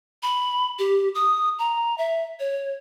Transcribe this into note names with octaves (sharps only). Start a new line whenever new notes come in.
B5
G4
D#6
A#5
E5
C#5